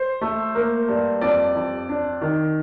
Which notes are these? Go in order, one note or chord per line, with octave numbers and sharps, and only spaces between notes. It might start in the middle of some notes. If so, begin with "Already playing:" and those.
Already playing: C5
A3
A#3
G2
F2 D5
F2
D4
D#3